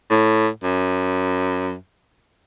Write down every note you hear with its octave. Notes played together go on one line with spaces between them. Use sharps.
A2
F#2